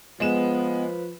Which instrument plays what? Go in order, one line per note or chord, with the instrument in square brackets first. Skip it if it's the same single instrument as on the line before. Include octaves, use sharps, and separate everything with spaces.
[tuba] F3 [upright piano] G#3 E7 [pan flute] B3 [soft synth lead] B4